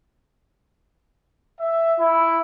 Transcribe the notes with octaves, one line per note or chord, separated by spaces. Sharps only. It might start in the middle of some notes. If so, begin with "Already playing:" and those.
E5
E4